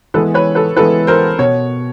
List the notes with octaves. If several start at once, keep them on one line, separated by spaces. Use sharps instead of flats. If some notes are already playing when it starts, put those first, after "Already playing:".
E3 G#3 B3 E4 A4 B4
B4 C#5
A4 B4
E3 G#3 B3 E4 A4 B4
A#4 C5
B2 C#5